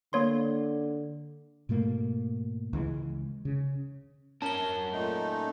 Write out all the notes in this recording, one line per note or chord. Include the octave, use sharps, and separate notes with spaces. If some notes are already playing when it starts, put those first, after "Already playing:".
D3 A#3 C#5 C6
G#2 B2 A3 A#3
C#2 E3 G#3
C#3
C#4 A#4 A5 G7
A#2 A3 D#4